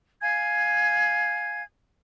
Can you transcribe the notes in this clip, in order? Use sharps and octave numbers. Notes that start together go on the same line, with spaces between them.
F5 G#5 G#6